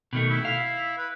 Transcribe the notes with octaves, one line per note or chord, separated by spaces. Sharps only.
B2 D#3 A3
E4
F5
B4